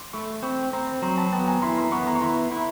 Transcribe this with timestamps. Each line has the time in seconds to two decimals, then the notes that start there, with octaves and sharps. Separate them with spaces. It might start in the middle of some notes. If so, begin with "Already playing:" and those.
Already playing: C6 D6
0.13 A3 B5 C#6
0.43 C4 B5 C#6
0.73 C4 A#5 C6
1.02 F#3 A#5 C6
1.18 A5 B5
1.32 B3 G5 A5
1.47 G#5 A#5
1.62 E4 A#5 C6
1.77 A#5 C6
1.92 B3 B5 C#6
2.07 A#5 C6
2.15 C#6
2.22 E4 A#5 C6
2.52 E4